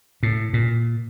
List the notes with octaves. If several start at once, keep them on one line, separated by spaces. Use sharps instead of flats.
A2
A#2